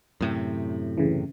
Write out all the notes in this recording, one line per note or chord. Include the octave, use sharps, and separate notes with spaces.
F#2 A2 C3
C#3 E3